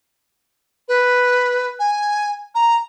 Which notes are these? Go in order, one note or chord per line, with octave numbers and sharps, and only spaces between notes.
B4
G#5
A#5